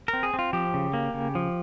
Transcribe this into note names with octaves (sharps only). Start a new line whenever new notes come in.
A#4
C4
G#4
C4
F4
F3 G4
C#3
A#3
C#3
F3